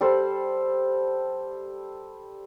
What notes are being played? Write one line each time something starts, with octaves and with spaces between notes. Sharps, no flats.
G3 A4 C5